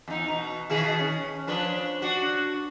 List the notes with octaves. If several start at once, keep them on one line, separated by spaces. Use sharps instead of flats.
E2 D#4
B2
B2 D#3 G#4
C#4
F3 D4 B4
D4 F#4